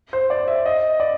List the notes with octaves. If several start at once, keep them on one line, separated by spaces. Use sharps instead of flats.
C5
D5
E5
D#5
D5